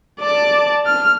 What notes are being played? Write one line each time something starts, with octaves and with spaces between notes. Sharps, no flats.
D5 A5
F6